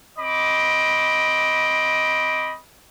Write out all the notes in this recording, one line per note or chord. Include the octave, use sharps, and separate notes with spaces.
C4 D#5 B5 D6